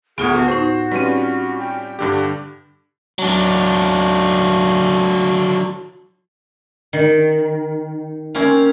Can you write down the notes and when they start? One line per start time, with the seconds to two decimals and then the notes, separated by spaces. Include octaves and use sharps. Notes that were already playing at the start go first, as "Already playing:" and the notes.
0.18 D2 A2 B3 F4 G#4 F#5
0.35 B3 F#4 A5
0.48 A2 D#4 C5
0.92 G3 C4 C#4 F4 B4
1.59 G5
1.99 G2 D3 G4
3.19 F#3 D4
6.93 D#3
8.35 A#3 C4 C#4